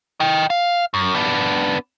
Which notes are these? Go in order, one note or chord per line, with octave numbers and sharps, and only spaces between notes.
D#5 G5
F5
F#2
B3 D4